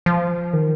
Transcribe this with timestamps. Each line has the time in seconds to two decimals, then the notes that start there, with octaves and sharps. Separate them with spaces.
0.06 F3
0.53 D#3